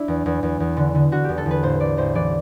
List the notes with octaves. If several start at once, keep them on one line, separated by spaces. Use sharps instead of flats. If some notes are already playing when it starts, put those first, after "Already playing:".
Already playing: D4 E4
E2
E2
E2
E2
D3
D3
D3 F#4
E2 G4
A4
E2 B4
A1 C5
A1 D5
A1 C5
E3 D5